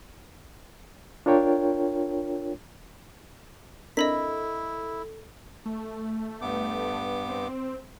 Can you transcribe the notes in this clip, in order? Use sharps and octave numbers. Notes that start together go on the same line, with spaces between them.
D4 F4 A#4 C#5 G5
C4 D4 E4 A4 A#4 D#5 B5 B6
A3
G2 B3 D6
C4